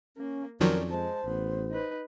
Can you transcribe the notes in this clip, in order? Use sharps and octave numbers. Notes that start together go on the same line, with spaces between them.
A#3 C#4
F2 D#3 F3 F#3 C#4 A#4 D5
G#3 C5 A5
A1 B3
D#4 B4